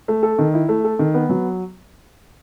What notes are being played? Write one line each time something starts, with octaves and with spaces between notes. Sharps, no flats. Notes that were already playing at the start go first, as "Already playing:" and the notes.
A3
A4
D#3
E4
A3
A4
D#3
B3
F#3